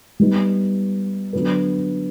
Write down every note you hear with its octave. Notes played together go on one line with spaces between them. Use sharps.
G3 B3 D#4
D3 F#3 B3